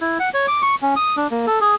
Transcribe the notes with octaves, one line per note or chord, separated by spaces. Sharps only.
E4
F#5
C#5
D6
C#6
C#4
D#6
D4
A#3
A4
G#4